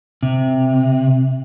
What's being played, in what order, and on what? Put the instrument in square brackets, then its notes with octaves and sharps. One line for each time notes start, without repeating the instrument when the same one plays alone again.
[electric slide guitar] C3